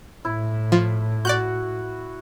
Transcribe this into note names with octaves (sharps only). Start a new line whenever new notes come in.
A2 E4
F3
F#4 D5 F#6 G6